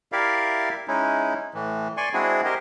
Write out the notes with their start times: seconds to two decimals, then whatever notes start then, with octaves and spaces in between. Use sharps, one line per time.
0.12 E4 G4 A#4 D5 E5 F5
0.88 G#3 C#4 D#4 E4
1.54 A2 E3
1.97 D5 G#5 C6 C#6
2.13 G#3 C4 D4 E4 F#4 G#4
2.45 G4 A#4 C5 D#5